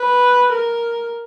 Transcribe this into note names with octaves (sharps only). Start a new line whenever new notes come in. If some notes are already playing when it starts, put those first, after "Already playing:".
Already playing: B4
A#4